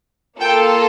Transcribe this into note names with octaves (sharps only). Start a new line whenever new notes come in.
A#3 F4 A4 G5